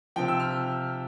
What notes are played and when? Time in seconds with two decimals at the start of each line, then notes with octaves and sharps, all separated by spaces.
0.16 C3 F3 G5
0.28 E6
0.40 F6